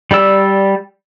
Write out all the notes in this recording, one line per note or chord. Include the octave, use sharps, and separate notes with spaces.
G3 G4 D5 E6